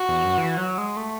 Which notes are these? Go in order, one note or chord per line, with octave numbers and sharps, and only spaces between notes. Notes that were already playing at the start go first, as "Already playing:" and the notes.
Already playing: F#4
E2
F#2
E3
F#3
G#3
A3